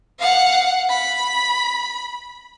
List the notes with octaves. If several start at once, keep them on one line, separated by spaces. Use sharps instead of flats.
F5 F#5
B5